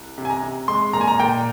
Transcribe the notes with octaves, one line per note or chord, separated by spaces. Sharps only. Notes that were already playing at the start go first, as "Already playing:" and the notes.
Already playing: C2
C3
G#5
A#5
C3
G#3 C6
A#2 A#5
G#5
A#5
A#2 G5